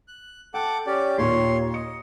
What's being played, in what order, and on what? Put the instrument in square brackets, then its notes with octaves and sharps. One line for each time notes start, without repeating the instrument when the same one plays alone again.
[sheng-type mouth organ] F#6
[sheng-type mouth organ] A4 F#5 D6 [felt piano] G5
[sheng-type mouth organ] C#4 G4 D5
[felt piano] D#2 A#2 [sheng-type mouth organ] C#5 C6
[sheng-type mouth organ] D#5 [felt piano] C#7